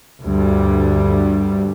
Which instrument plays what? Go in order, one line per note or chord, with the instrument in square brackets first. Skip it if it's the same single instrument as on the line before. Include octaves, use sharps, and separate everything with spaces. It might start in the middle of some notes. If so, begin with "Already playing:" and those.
[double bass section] D2 G2 G3